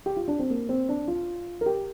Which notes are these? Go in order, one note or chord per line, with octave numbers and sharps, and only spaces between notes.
G4
F4
D4
C4
A#3
C4
D4
F4
A#4
G4